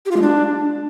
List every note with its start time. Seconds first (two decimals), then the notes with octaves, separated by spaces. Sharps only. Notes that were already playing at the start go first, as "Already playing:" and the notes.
0.06 G4
0.11 F4
0.16 G#3
0.22 D4